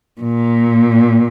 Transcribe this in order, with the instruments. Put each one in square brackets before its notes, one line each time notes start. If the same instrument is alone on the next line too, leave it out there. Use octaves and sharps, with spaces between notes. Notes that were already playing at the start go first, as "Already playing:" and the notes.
[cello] A#2